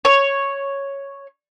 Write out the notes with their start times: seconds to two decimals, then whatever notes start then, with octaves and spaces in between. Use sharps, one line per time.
0.05 C#5